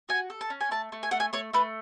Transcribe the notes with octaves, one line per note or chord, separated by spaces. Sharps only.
F#4 G#5
A4
A5
C#4
G#5
A3 A5
A3
G#5
A3 F#5
G#5
A3 C#5
A3 B4